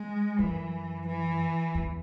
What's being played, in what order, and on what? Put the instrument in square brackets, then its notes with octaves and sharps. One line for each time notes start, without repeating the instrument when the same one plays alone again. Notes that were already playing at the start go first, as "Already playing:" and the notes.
Already playing: [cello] G#3
[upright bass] F#2 [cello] E3
[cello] E3
[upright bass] E2